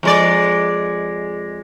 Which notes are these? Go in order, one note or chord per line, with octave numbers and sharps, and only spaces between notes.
F2 G#3 D5